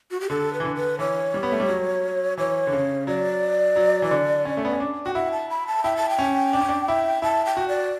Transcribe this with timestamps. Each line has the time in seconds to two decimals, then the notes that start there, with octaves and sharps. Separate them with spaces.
0.11 F#4
0.21 G4
0.30 D3 A4
0.53 B4
0.60 E3
0.65 D3
0.76 B4
0.99 E3 C#5
1.34 G3
1.43 B3
1.52 A3
1.60 G3
1.69 F#3
2.38 E3 C#5
2.67 D3
2.73 C#3
3.07 F#3 D5
3.76 F#3
4.02 E3
4.11 D3
4.45 C#4
4.57 A3
4.65 B3
4.73 C#4
4.80 D4
5.06 F#4 G5
5.15 E4 F#5
5.32 A5
5.50 B5
5.67 A5
5.84 E4 G5
5.97 A5
6.10 G5
6.19 C#4
6.53 D4
6.61 C#4
6.69 D4
6.88 E4
7.22 E4 A5
7.45 G5
7.57 F#4
7.69 D5